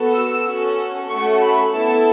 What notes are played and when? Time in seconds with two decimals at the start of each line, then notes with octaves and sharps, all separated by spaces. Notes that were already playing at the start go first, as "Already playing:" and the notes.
Already playing: B3 F#4 A4
0.13 E6
0.46 C#4 F#4 A4
1.09 A3 C#4 F#4 A4 C#6
1.41 B5
1.73 B3 E4 A4 A5